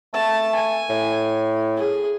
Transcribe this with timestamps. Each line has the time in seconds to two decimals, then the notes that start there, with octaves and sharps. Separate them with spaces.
0.14 A3 A5
0.55 G#5
0.90 A2
1.77 G#4